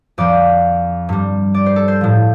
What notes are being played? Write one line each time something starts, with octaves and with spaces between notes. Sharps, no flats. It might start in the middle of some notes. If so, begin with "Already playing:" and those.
F2 F3 D5
G2 G3
D5
C5
A4
C5
A2 F3